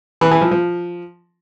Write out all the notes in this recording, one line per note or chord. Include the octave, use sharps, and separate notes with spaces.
E3
E3
F3
F3